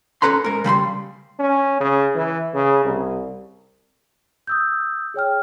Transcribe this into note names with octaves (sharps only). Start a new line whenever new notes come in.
C#4 A4 B4 A#5 C6
G#2 A#4
C#3 G3 B5 C6
C#4
C#3
E3
C#3
C2
D#6 E6 G6
G#4 C#5 G5 F6